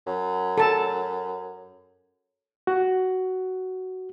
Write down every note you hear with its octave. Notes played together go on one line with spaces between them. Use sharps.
F#2
A4 A5
F#4